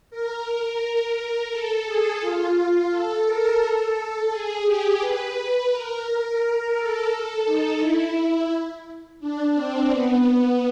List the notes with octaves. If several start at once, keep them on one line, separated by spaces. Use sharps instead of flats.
A#4
A4
G#4
F4
A4
A#4
A4
G#4
G4
B4
A#4
A#4
A4
D#4
E4
D4
C4
B3